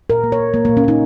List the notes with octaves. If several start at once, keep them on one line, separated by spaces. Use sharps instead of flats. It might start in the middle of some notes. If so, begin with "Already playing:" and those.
A#2 A#4
A#3
C#5
A#3
A#3
A#3
A#2
C#4
A#3 D#4